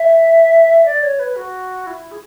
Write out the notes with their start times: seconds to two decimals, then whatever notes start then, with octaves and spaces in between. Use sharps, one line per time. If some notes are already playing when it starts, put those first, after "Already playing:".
Already playing: E5
0.85 D5
1.02 C#5
1.19 B4
1.36 F#4
1.86 E4
2.11 G#4